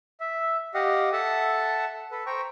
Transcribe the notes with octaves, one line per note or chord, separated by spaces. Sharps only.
E5
G4 D#5 F5 F#5
A4 E5 F#5 A5
A4 B4
C5 G5 A#5 C#6